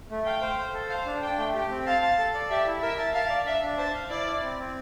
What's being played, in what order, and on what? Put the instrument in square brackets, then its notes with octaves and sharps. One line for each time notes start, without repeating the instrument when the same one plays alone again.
[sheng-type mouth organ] A3
[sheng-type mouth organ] F5 [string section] G5
[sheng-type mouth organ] C5
C5
A4
[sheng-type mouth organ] C5 [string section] F5
[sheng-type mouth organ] D4
[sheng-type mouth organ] D4 [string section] G5
[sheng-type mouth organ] A3
G4
C4
[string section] F5 [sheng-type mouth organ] A5
[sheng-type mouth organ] A5
A4
D5
[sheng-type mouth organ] G4 [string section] E5
[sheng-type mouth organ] E4
[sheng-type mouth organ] A#4 [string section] E5
[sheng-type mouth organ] A5
[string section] F5 [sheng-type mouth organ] A5
[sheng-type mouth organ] D5
[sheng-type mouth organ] D4 [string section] E5
[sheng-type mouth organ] D4
[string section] C5 [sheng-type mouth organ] A5
[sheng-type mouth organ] F5
[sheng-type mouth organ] E4 [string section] D5
[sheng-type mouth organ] E4
C4
C4